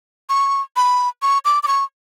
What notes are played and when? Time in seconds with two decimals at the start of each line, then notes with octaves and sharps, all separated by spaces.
0.29 C#6
0.76 B5
1.22 C#6
1.45 D6
1.63 D6
1.68 C#6